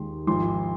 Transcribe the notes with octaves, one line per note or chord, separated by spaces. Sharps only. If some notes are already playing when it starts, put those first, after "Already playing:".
Already playing: D#2 D#3 G#3 D#4 C6
G#1 G#2 F3 C6